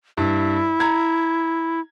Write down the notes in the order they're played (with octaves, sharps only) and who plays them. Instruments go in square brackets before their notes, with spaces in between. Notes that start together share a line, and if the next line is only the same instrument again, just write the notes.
[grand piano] G2 [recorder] E4
[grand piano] A#5 G#6